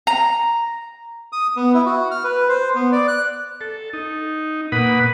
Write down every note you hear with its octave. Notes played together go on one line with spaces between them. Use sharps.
A#5
D#6
B3
E4
F#4
F6
B4
C5
B3
D5
F#6
A4
D#4
A#2 B4 F#5 B5 D#6